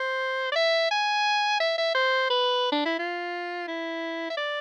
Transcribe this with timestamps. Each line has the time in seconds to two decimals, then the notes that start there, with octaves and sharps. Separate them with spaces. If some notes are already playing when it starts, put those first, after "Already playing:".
Already playing: C5
0.52 D5
0.55 E5
0.91 G#5
1.60 E5
1.77 E5
1.95 C5
2.30 B4
2.72 D4
2.85 E4
2.99 F4
3.68 E4
4.30 E5
4.37 D5